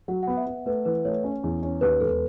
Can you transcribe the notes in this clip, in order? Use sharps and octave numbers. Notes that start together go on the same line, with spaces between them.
F#3 F#5
F#5
B3
E5
B3
A3 B4
E3 B4
A3 C#5
C#4
E2
C#4
D#2 B4
E1 A4